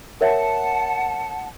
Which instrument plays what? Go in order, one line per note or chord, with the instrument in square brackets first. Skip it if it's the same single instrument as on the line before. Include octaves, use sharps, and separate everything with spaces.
[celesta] A#4 C#5 E5 [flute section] F#5 A5